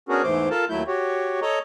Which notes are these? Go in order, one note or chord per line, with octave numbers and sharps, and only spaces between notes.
B3 C#4 D4 F#4 G#4 A#4
E2 G#2 E3 A3 C5 D6
F4 A4 A#4 A5
D#2 F#3 A3 E4 G6
F#4 G4 C#5
A4 C#5 D#5 A#5